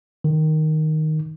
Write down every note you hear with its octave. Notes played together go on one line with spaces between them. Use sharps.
D#3